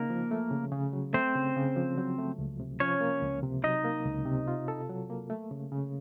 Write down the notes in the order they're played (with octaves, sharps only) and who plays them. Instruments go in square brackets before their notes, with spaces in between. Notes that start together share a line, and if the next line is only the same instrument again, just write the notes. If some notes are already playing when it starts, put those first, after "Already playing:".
Already playing: [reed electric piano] C#3 C4 D#4 [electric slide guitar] A#3 A#4
[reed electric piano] F3
A3
C#3
C#3
F#3
[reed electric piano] A3 [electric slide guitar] C4 C5
[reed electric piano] C#3
C#3
F3
F#3
A3
C#2
C3
[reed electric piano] F3 [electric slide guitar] C#4 C#5
[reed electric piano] A#3
C#2
C3
[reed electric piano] F#3 [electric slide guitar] D#4 D#5
[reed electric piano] A#3
C#2
C3
F4
A4
F#3
A#3
A3
C#3
C#3